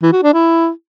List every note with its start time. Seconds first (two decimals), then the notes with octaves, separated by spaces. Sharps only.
0.02 E3
0.13 F#4
0.23 D4
0.33 E4